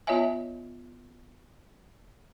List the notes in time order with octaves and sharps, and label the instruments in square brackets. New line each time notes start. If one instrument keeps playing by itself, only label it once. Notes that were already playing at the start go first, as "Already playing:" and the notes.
[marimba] B3 F4 C#5 D#5 E5 G#5